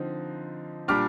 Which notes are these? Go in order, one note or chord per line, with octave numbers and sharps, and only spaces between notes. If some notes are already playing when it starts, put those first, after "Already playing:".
Already playing: D3 F3 C4 D#4
A#2 G3 D4 D6 F6